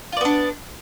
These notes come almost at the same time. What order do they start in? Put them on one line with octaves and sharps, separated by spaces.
F4 D5 B3 D4